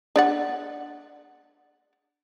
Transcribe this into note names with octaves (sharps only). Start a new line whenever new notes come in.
D4 D5 F#5